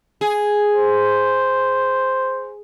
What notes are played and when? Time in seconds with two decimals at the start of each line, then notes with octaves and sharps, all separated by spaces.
0.21 G#4
0.74 C5